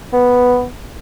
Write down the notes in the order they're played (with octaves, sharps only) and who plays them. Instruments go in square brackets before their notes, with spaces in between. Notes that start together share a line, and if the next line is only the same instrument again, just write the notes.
[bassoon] B3